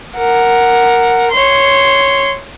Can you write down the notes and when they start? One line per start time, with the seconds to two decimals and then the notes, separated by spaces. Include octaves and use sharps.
0.17 A#4 F#5
1.32 C#5 C6